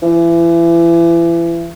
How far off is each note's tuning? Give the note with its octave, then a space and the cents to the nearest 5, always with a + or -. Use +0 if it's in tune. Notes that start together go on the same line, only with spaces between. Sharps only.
E3 +35